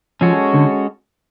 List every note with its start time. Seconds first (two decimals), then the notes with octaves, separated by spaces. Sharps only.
0.21 F3 G#3 C#4 F#4 A4 C#5
0.54 D3